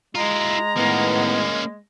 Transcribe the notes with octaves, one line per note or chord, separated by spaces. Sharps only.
G#3 E4 F4 A#5
A2 D#3 A#3 B3 C#4